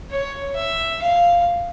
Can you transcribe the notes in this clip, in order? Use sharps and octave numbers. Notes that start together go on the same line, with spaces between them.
C#5
E5
F5